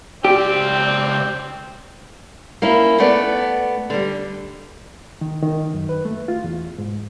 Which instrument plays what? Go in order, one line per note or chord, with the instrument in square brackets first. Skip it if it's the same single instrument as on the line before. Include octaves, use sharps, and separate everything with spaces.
[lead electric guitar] C#2 D5 [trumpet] C4 [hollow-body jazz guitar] G4
[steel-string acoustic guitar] A#3 C#4 E4
A3 B3 D5
D3 G3
[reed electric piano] D#3
D#3
F#2
B4
A3
F4
E2
G#2